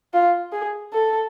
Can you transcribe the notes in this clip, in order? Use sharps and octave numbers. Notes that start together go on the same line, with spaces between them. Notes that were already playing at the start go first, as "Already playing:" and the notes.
F4
G#4
A4